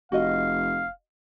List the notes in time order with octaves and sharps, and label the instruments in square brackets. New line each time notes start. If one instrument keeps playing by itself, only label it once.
[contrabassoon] F1 [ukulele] F#4 D#5 [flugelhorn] F5